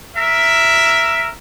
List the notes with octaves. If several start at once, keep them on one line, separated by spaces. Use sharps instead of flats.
A#4 E5